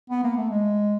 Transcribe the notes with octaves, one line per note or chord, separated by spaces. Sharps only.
B3
A#3
A3
G#3